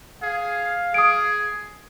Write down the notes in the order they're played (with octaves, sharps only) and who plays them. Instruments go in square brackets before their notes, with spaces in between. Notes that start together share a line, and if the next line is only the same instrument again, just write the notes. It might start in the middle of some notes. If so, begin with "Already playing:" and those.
[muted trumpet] G#4 [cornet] F5
[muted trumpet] G#4 [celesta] D#6 D7